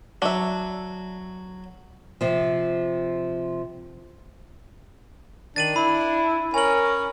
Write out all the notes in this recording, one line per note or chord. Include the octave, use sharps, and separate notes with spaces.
F#3 D4 E5
C3 F3
D#3 D4 A6 D#7 F#7
E4 B5
C#4 A#4 G#5 F#7